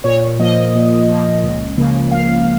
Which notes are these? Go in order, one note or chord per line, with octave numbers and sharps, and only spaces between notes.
A#2 C#5
F3 A#3 D#5
A#2
F3 A#3
C#2
C#3 F3 A#3
C#2 F5